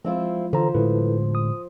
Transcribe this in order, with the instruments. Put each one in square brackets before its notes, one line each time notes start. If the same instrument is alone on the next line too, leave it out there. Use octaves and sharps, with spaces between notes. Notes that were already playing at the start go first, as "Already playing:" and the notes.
[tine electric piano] F3 G#3 [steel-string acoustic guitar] C4 E4 F4
[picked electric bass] D3 E3 [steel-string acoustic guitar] F3 [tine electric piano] A4 C5 A#5
[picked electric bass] A2 D3 G#3 [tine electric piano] E4 A4 B4
[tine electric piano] D#6